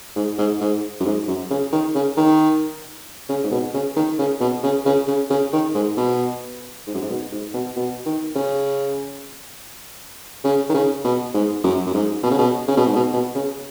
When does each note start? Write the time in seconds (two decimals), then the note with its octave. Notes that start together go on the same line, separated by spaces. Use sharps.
0.16 G#2
0.38 G#2
0.61 G#2
1.00 F#2
1.06 G#2
1.28 F#2
1.51 C#3
1.73 D#3
1.95 C#3
2.17 D#3
3.29 C#3
3.44 G#2
3.51 B2
3.74 C#3
3.96 D#3
4.19 C#3
4.41 B2
4.63 C#3
4.86 C#3
5.08 C#3
5.30 C#3
5.53 D#3
5.75 G#2
5.97 B2
6.87 G#2
6.94 F#2
7.02 G#2
7.10 B2
7.32 G#2
7.54 B2
7.76 B2
8.06 D#3
8.36 C#3
10.45 C#3
10.70 D#3
10.74 C#3
11.05 B2
11.34 G#2
11.64 F#2
11.86 F#2
11.94 G#2
12.23 B2
12.31 C#3
12.39 B2
12.68 C#3
12.77 B2
12.86 G#2
12.96 B2
13.13 B2
13.35 C#3